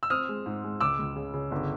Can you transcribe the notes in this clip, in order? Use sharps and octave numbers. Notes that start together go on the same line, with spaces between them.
E6
C4 D#6 F6
G#3
G#2
G#3
C#2 D6 E6
C#2
C#3
C#3
G1